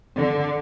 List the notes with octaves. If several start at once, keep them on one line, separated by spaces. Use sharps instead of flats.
D3